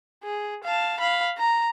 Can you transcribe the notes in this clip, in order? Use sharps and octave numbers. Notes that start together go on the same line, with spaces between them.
G#4
F5 A5
F5 B5
A#5